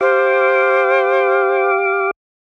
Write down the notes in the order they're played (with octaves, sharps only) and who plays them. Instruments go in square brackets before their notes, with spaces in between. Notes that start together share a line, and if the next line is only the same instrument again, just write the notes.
[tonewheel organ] G4 F5 D6 [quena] C5